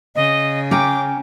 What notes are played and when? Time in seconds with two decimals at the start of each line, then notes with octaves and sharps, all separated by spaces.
0.15 C#3 D#5
0.71 C#4 G5 A#5 D6